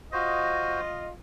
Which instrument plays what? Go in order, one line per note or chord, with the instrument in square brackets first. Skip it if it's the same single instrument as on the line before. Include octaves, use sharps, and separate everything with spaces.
[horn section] F4 D#5 [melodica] F#4 C5